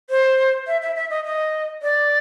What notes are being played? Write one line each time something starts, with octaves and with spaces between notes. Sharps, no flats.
C5
E5
E5
E5
D#5
D#5
D5